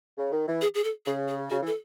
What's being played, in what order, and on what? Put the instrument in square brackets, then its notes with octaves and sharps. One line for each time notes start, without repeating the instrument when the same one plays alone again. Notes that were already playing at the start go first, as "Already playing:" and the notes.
[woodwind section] C#3
D#3
E3
[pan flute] G#4
G#4
A4
[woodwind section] C#3 [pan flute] G#4
[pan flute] G#4
[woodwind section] C#3 [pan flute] F#4
[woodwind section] E3
[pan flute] A4